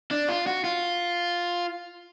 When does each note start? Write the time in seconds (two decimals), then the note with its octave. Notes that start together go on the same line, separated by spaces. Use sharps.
0.11 D4
0.29 F4
0.47 F#4
0.64 F4